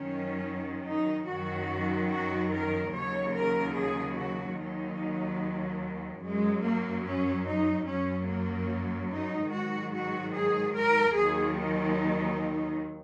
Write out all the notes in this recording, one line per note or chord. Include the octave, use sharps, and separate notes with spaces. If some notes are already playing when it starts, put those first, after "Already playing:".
Already playing: F#2 D#3 F#3 C#4
D#4
F#2 D#3 F#3 F#4
F#4
A#4
D#2 C#3 F#3 C#5
A#4
G#4
F#4
D#2 D#3 F#3 D#4
F#2 F#3 G#3
A#3
C#4
D#4
F#2 F#3 C#4
A#3
D#4
G#2 D#3 F#3 F#4
F#4
G#4
A#4
D#2 D#3 F#3 G#4
D#4